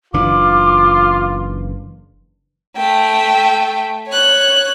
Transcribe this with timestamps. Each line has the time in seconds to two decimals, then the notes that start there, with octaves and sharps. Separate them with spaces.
0.14 F#1 E3 D4 F4 D6
2.77 A3 G5
4.09 C#5 F#6